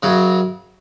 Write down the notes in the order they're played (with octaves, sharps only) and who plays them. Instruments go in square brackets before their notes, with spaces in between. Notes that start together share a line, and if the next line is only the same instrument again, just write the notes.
[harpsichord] F#2 C#3 F#3